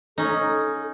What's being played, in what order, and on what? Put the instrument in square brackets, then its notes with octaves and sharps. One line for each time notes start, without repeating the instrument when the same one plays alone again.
[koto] C#4 D#4 [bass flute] A4